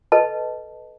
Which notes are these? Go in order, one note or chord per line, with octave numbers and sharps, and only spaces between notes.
A4 B4 D#5 A5